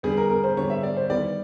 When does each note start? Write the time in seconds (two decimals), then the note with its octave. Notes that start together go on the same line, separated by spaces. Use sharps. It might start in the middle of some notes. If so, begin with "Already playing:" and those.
0.03 D3 G3 B3 G#4
0.17 A#4
0.30 A#4
0.44 C5
0.57 D3 G3 B3 C#5
0.70 E5
0.83 D5
0.97 C5
1.10 D#3 G3 B3 D5